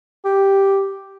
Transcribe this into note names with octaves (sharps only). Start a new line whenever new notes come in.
G4